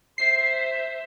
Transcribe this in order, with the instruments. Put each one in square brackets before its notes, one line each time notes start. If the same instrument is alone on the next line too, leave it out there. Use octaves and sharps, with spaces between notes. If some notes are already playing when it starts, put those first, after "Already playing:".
[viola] C5 E5 [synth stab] C7